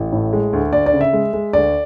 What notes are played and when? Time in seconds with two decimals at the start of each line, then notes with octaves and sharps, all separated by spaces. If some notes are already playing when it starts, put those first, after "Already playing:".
Already playing: A1
0.12 A2
0.33 G#3
0.53 D2
0.73 D2 D5
0.86 D5
0.93 C#3
1.01 E5
1.13 G#3
1.33 G#3
1.53 D2 D5